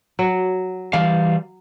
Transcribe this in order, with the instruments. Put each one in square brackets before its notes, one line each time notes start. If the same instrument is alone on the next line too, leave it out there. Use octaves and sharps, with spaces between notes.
[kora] F#3
[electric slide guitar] E3 G3 F5